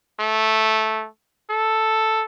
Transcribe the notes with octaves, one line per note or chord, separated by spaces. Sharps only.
A3
A4